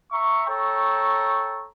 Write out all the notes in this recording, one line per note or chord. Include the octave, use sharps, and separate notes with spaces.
E5 A#5 C#6
A4 C#5 G5 A#5 C#6